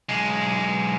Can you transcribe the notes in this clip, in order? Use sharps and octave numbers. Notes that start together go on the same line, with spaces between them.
B1 G#3